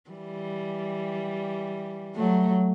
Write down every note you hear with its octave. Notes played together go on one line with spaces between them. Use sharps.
E3 G3
F#3 A3